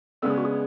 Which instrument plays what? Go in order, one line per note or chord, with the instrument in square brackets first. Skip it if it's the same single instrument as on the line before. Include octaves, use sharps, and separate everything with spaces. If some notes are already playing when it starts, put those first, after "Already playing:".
[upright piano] C#3 G#3 B3 D4 [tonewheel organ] A4
[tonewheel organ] G#4
F#4
G#4